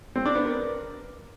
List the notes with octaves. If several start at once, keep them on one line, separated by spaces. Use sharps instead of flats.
C4
D4
B3
A#4